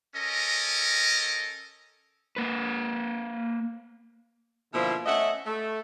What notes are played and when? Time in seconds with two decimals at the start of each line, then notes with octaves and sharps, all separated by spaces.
0.15 C#4 A4 A#4 D#5
2.36 A#3 B4
4.73 B2 D3 F3 A#3 E4
5.06 A3 C#4 D#5 E5 F#5
5.45 A3